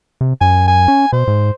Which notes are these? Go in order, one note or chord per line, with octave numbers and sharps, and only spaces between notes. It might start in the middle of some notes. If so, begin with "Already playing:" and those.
C3
F#2 G#5
G#5
C#4
B2 C5
G#2